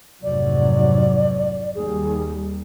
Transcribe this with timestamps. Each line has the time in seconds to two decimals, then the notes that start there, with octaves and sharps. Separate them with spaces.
0.23 F1 G#2 F#3 D5
1.75 D#2 G3 G#4